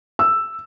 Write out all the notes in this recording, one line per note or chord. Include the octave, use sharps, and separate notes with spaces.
E6